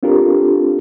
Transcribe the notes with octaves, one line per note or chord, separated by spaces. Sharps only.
C4 D4 F4 G4 A4 A#4